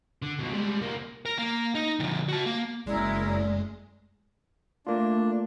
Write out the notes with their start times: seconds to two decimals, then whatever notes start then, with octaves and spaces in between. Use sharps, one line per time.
0.22 D3
0.39 C#2 B2
0.53 G3 G#3
0.81 C2 A#3
1.26 A#4
1.39 A#3
1.75 D#4
2.00 D3 F3
2.29 F#4 A5
2.46 A#3
2.87 F#1 G#3 C#4 E4 A#4 D5
4.87 A3 A#3 D4 F4